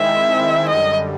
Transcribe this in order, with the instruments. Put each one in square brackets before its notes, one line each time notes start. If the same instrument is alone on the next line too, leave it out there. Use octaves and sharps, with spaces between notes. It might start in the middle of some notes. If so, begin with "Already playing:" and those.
Already playing: [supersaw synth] D#3 G#3 C4 E4 [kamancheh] E5
[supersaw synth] F#2 D3 G3 [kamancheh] D#5